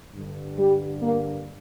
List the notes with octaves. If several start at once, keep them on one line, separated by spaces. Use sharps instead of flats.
G2 D3
G3
A#3